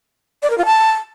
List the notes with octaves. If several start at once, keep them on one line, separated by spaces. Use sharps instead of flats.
D5
A#4
F4
A5